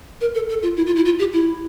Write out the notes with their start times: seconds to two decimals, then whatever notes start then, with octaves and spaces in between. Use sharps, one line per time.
0.21 A#4
0.34 A4
0.49 A4
0.63 F4
0.77 E4
0.86 F4
0.96 E4
1.05 F4
1.19 G4
1.33 E4